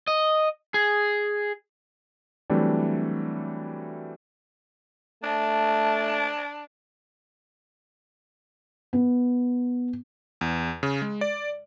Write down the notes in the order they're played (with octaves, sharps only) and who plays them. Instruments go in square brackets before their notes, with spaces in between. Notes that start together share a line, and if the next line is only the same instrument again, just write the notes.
[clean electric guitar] D#5
G#4
[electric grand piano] E3 F#3 G3 A3 C4 D4
[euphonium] A3 [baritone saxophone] D4 [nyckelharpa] A5
[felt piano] B3
[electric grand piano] E2
C#3
G#3
D5